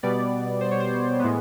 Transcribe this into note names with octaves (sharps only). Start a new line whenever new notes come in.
B2 G3 B3 D5
C5
C#5
C5
A2 E3 G#3 B3